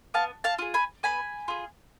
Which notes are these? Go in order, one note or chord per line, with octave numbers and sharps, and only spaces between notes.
B3 F5 A5
F5 A5
F4 G#4
G#5 B5
B3 G#5 B5
F4 G#4